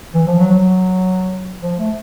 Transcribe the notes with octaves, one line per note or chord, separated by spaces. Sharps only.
E3
F3
F#3
F#3
F3
A3